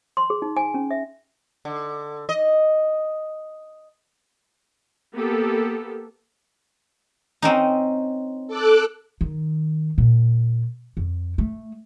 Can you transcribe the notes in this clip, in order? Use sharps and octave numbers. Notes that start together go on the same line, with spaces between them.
C6
G#4
D#4
G#5
C#4
E5
D3
D#5
A#3 B3 G4 A4
C4 C#4 D#4
A4 D6 F#6
D#3
A#2
F2
A3